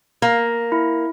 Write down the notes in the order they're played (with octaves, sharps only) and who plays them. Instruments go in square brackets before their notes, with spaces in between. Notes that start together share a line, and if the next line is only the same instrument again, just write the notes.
[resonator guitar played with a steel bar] A#3
[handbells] E4